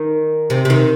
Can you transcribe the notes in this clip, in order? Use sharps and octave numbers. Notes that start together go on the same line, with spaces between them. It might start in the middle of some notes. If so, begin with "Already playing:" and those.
Already playing: D#3
C3
C3
D#3